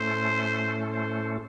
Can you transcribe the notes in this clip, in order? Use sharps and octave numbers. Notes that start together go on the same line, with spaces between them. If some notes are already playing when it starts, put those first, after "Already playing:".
Already playing: A2 A3 C#4 A4 C5
C5